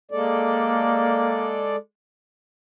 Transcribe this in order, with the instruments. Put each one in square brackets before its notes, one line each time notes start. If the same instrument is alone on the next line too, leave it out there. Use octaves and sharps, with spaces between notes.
[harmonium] G#3 A4 D5 [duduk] A#3